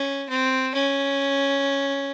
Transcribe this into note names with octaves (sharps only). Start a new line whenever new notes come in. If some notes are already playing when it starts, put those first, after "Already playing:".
Already playing: C#4
C4
C#4